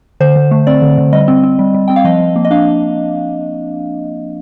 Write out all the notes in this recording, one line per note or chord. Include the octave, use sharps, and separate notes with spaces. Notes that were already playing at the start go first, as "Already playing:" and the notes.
D3 C5
D3
A3
C4 D5
D3
D3
G3 D#5
C4
C4
G3
G3
C4 G5
F5
F3 D#5
F3
A#3
D#5
D4 F5